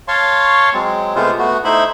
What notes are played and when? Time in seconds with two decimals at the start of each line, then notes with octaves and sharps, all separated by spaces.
0.08 C#5 F5 A5 C6 C#6
0.73 F#3 G#3 C4
1.15 C3 G#3 A3 B3 F4 C5
1.39 A3 B3 F#4
1.65 A3 D#4 E4 C5 E5 B5